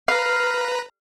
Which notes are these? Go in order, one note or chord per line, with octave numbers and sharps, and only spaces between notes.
B4 F5 A#5